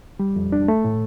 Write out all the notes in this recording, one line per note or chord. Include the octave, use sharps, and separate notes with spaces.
G3
F2
D4
A3
A2